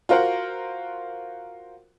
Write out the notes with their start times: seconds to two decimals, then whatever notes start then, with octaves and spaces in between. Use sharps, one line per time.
0.09 F4 F#4 A#4 C5 F#5